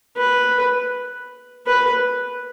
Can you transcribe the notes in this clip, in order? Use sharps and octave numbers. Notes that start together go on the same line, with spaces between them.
B4
B4